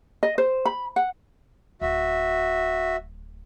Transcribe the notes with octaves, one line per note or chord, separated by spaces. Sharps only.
D#5
C5
B5
F#5
D1 F#4 E5